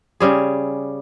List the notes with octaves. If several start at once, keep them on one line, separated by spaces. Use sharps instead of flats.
C#3 G3 G#4